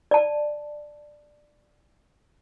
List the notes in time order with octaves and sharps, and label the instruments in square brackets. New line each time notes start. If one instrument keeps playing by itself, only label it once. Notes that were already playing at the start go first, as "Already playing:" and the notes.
[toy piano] D5 A5